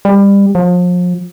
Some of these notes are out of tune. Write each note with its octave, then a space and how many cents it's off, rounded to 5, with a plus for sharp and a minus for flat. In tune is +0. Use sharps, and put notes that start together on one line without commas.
G3 +25
F3 +35